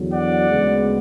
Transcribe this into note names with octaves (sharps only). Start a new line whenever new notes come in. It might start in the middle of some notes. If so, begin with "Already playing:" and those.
Already playing: E2 D3 F#3
D5 F#5
D2 C#3 G#3 B3